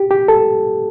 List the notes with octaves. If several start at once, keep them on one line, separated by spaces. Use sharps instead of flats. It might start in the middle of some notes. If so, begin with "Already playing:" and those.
Already playing: G4
G4
A4